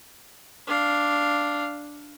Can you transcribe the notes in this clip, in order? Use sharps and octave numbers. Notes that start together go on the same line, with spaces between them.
D4 F5